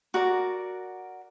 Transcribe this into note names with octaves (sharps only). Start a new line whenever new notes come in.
F#4 A#4 D5